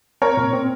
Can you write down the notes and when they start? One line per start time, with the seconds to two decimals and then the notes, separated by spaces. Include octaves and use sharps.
0.22 C4 A#4 C#5
0.37 A#2
0.53 C4